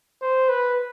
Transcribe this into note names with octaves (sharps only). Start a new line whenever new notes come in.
C5
B4